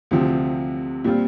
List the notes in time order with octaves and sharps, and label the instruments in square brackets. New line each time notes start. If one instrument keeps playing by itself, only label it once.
[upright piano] D2 C3 F3 C4
A#2 G3 C4 F4